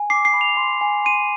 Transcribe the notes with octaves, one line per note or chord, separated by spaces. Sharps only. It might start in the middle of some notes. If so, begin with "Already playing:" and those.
Already playing: G#5
D6 C7
C7
B5
F7
C6
G#5
C6 D#7